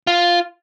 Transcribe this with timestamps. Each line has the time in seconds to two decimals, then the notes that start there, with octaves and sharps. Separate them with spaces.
0.07 F4